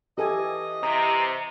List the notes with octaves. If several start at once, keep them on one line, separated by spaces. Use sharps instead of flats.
E3 G4 A4 D#5 G#5
C3 A#5 D#6